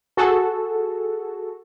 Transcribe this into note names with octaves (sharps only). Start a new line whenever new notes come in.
F#4 G#4 A4